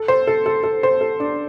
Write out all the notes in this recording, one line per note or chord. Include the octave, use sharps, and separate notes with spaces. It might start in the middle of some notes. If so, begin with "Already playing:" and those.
Already playing: A4
C5
A4
A4
A4
C5
A4
D4